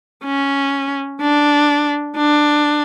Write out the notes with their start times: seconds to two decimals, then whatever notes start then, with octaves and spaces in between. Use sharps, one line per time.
0.25 C#4
1.21 D4
2.17 D4